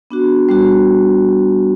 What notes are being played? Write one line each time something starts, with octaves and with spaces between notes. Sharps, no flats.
B3 D4 F#4
G3 B3 D4 F#4